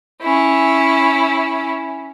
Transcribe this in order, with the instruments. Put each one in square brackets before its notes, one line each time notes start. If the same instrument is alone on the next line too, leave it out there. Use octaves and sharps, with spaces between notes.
[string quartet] C#4 E4